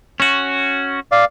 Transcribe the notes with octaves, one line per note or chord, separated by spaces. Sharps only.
C#4 F#4
D5 F5